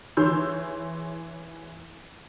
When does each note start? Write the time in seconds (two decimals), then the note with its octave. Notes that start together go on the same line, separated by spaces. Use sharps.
0.17 E3 G#4 C#5 C6 E6 G6